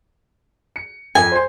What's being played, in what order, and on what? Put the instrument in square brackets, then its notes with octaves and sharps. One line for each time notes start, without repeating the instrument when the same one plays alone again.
[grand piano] C#7
[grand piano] F2 [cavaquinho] G#5
[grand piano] C5 C6